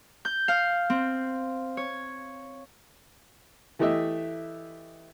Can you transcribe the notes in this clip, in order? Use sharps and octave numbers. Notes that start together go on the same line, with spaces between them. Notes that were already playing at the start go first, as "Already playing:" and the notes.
G6
F5
C4
C#5
E3 A3 G4 D#5 E5